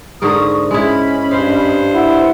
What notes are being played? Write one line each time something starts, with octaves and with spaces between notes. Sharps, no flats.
G#2 D3 A#4 C#6 D#6
G#3 C#4 E4 D#5 B5
G2 C5 F5
E4 F#5